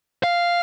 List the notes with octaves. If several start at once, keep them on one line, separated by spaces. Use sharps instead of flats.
F5